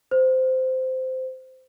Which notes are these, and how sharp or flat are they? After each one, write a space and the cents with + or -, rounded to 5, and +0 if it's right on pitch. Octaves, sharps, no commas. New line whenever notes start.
C5 -15